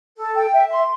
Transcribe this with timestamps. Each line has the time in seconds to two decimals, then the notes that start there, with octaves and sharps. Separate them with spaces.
0.16 A4
0.36 G5
0.53 E5
0.71 C6